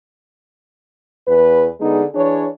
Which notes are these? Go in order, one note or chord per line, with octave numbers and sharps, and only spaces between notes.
E2 B4
D3 G#3 B3 D#4 G#4
E3 D4 G#4 C#5